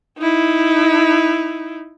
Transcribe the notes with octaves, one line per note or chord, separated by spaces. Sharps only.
D#4 E4